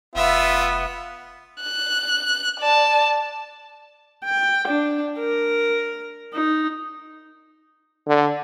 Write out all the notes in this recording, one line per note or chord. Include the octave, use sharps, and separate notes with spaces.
F1 B3 F4 E5 E6
F#6
D5 A5
G5
D4
A#4
D#4
D3